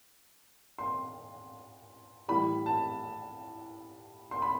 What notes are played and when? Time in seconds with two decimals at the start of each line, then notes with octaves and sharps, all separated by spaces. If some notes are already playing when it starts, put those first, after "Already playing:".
0.79 C6
2.28 A2 E3 G3 B5
2.66 A5
4.31 C6
4.42 B5